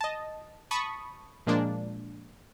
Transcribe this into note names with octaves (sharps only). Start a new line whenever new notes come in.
D#5 A5
A5 B5 C#6 D#6
A#2 F3 G#3 A#3 D4